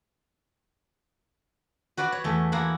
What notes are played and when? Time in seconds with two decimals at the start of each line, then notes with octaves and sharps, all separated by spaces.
1.97 F#4 B4 D5 F#5
2.12 C#5
2.24 E2 A3
2.52 E2 A#3 E4 F#5